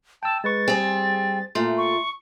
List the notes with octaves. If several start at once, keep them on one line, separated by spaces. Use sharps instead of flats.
G5 A5 E6
G#3 B4 C#6 A6
G3 C4 G#4
A#2 A3 C6
C#6